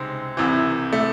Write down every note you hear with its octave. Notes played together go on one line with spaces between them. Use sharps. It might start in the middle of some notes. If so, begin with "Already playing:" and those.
Already playing: C#2 C3 G#3 C4 D#4
C2 C3 E3
A3